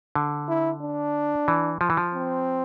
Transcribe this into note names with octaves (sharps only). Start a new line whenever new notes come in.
D3
E4
D4
E3
F3
E3
F3
C4